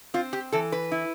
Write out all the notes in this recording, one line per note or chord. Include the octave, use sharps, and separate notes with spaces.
C4 F4
G4
E3 A4
B4
E4